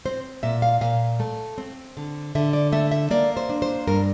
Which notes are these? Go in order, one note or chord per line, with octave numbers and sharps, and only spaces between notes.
C4 C5
A#2 E5
F5
A#2 F5
A3
C4
D3
D3 E5
D5
A3 E5
E5
A#3 D5
C5
D4
C5
G2 A#4